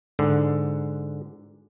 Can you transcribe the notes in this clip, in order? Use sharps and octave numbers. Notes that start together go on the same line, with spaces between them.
G#2 D3